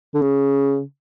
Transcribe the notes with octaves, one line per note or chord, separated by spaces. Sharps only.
D3
C#3